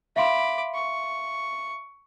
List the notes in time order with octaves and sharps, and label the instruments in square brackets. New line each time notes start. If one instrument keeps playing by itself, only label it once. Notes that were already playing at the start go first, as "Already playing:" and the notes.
[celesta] E5 F5 C6 [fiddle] B5 D6
[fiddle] C#6